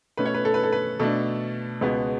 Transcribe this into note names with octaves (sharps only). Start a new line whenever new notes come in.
B2 A3 C#4 B4
C#5
B4
A4
B4
A4
B4
B2 A3 D4 A4
C#2 B2 G#3 B3